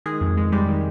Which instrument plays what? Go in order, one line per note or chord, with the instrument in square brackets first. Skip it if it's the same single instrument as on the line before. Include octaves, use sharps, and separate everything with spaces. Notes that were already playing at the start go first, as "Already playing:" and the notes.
[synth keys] D#3 G#3 G#4
F2
G#3
G3 G#3 G4
D#3